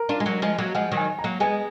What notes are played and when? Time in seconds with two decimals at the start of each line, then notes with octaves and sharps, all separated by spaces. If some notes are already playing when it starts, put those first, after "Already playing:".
Already playing: A#4
0.09 D4 F4
0.20 G#3
0.26 F#3 A#3
0.42 F3 G#3
0.58 F#3 A#3
0.75 F3 G#3 F#5
0.92 D#3 F#3
0.97 G#5
1.19 A#5
1.24 F#3 A#3
1.40 G#3 B3 G#5